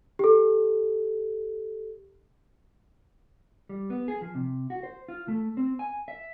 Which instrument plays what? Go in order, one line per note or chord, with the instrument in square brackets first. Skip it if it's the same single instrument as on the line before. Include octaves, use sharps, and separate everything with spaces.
[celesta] G4 A4
[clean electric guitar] G3
B3
G#4
F3
C3
F#4
C5
F4
A3
C4
G#5
E5